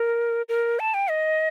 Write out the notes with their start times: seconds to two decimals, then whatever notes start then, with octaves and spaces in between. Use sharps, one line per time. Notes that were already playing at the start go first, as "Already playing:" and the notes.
Already playing: A#4
0.49 A#4
0.79 A5
0.94 G5
1.10 D#5